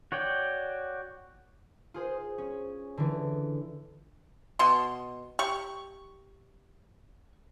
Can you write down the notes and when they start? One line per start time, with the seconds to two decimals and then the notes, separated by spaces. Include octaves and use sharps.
0.12 F#4 C#5 D5 G5
1.94 F4 G#4 C5
2.38 C#4
2.97 D3 E3
4.59 B2 C6
5.39 G4 C#6